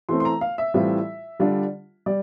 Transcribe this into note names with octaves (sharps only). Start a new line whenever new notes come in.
E3 A3 C4 C6
C6
A#5
F5
E5
A2 E3 G3 C4 F4
D3 G3 D4 F4
G3 D5